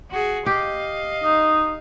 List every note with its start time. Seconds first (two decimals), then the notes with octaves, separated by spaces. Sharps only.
0.11 F#4 G#4
0.46 G4 D#5 F5
1.23 D#4